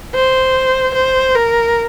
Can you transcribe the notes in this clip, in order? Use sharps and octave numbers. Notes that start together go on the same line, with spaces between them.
C5
C5
A#4